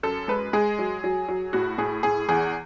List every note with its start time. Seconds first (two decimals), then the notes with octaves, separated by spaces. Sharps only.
0.03 F#2 A4
0.28 G#3 B4
0.53 G#3 G#4
0.79 F#3
1.04 F#3
1.29 F#3
1.53 A2 F#4
1.78 A2 G#4
2.03 A2 G#4
2.29 E2 G#4